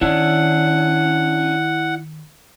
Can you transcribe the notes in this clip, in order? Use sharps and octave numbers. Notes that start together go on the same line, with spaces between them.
D#3 C#4 D4 E4 D5 F#5